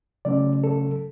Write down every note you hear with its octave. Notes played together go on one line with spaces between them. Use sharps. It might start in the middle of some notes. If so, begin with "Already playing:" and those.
C#3 F#3 A3 C#4 D5
A4